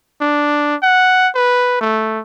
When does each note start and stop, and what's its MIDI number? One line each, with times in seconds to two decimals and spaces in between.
0.21 0.75 62
0.82 1.28 78
1.35 1.80 71
1.81 2.20 57